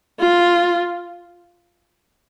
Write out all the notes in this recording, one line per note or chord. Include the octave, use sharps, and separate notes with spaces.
F4